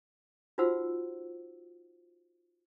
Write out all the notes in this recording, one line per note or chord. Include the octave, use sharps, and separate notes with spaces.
D#4 F4 F#4 C5 F#5 E6